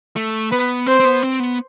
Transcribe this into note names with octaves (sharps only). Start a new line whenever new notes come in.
A3
B3 B4
C4 C5
C4
B3
C4
B3